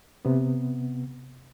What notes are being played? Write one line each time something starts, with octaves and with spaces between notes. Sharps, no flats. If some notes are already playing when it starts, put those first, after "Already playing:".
C3 B3